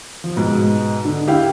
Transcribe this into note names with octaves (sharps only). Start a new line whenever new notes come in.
F3
G#2 B2
D3
E4 G4 F5 G5